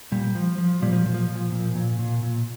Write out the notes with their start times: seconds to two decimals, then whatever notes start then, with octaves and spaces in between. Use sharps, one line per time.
0.12 A#2 G3
0.35 F3
0.58 F3
0.82 A#2 G3
0.93 F3
1.05 A#2
1.14 F3
1.29 A#2
1.52 A#2
1.75 A#2
1.99 A#2
2.23 A#2